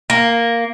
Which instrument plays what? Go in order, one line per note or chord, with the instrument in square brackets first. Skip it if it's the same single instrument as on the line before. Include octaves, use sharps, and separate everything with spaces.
[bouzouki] A#3